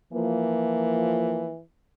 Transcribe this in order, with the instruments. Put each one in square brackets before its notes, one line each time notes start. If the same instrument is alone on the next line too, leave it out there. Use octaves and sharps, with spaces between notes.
[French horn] E3 [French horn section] F3 A#3